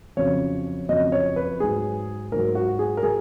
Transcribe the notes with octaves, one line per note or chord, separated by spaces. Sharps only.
F2 C#3 F#3 C#5
F2 C#3 F#3 D#5
C#5
B4
G#2 F#3 G#4
G#2 F#3 A#4
F#4
G#4
A#4
F#3 G#4